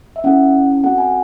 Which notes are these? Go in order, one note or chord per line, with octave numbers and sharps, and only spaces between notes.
E5
C#4 E4 A4 F#5
C4 F#4 A4 F#5
G#5